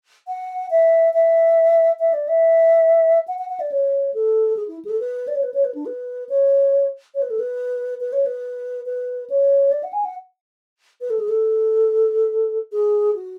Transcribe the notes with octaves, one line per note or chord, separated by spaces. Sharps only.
F#5
E5
E5
E5
D5
E5
F#5
F#5
F#5
D5
C#5
A4
G#4
E4
G#4
A4
B4
D5
C#5
B4
C#5
B4
D4
B4
C#5
C#5
B4
A4
B4
B4
C#5
B4
B4
C#5
D5
F#5
G#5
F#5
B4
A4
G#4
A4
G#4
F#4